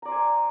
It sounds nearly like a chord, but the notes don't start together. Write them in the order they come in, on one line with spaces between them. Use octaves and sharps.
A#5 D5 C5 G#5